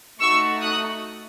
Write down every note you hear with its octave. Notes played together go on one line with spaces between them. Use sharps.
A3 D#4 F#4 C#6 E6
D#6 F#6